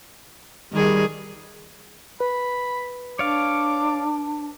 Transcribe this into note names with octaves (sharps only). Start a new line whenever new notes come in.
D#3 G3 G#4
B4 B5
D4 C#5 D5 F5 D6